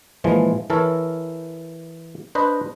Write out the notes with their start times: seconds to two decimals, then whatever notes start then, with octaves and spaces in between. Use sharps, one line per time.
0.24 A#2 E3 F3 G#3
0.70 E3 A4 A#4 C#5
2.35 D4 B4 C5 D#5